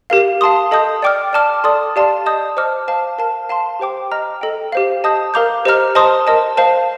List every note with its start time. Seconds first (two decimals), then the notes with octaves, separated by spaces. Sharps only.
0.10 G4 A#4 F5
0.41 F5 A5 C6 D#6
0.71 A4 D#5 A5 D#6 G6
1.02 D5 G5 D6 F6
1.33 D5 A5 D6 F6
1.64 A4 D5 A5 C6 D#6
1.96 G4 D5 F5 A5 C6
2.26 D#5 A5 D#6 G6
2.57 C5 D#5 A5 D6 F6
2.88 C5 F5 A5
3.18 A#4 F5 A5
3.49 F5 A5 C6
3.79 G4 C5 G5 D6
4.11 D#5 A#5 F6
4.41 A4 D#5 G5
4.72 G4 C5 F5
5.04 D#5 A5 D#6 G6
5.34 A#4 F5 A#5 D6 G6
5.65 G4 C5 D#5 A#5 F6
5.95 C5 D#5 A5 C6 D#6
6.27 A#4 D#5 A5
6.57 C5 F5 A5